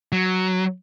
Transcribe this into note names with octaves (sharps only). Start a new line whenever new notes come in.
F#3